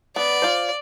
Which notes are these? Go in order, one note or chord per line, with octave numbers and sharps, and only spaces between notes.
B3 D5
F4 C5